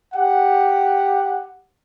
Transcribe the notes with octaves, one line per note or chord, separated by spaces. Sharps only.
G4 F#5